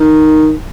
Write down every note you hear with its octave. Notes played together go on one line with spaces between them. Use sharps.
D#3